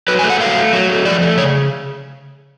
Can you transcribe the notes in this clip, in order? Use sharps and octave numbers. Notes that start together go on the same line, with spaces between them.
F#3 B4
G#5
A3
F#5
F#3 F5
A3
F#3
A3
F3 D5
A3
C#3 C#5